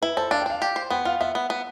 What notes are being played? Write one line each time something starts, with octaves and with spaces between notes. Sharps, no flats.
E4 B4
A4 C5
D4 F5
G5
D4 F5
G4
C5
B3 G5
F4 F5
B3 E5
B3
B3